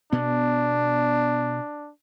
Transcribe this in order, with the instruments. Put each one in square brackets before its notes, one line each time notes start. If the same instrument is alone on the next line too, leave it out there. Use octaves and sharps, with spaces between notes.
[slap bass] B2 B3 [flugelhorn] D4